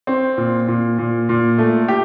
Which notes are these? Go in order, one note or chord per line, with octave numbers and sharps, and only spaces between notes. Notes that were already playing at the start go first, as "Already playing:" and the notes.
C4
A#2
A#2
A#2
A#2
A3
G4